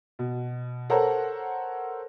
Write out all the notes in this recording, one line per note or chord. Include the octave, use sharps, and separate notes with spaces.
B2
A4 A#4 C5 C#5 F#5 A#5